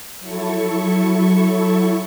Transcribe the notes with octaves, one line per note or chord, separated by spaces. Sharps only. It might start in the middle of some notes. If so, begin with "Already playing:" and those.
F#3 E4 A4 C#6